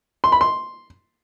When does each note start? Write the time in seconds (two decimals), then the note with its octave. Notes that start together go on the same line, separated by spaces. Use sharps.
0.24 C6
0.32 B5
0.41 C6